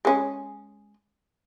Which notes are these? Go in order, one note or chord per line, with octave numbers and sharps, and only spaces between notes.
G#3 C#4